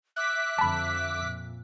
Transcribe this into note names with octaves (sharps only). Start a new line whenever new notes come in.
E5 D6 F#6 B6
F2 D3 A5 B5
A#2